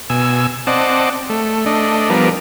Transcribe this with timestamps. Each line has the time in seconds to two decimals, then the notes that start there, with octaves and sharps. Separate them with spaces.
0.10 B2 G#5 E6
0.67 C4 D5 D#5 F#5 A5
1.30 A3
1.66 A3 D4 D#5
2.10 F3 G3 B3 D4 A#4